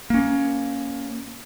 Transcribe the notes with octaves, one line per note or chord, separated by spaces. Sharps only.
A#3 C#4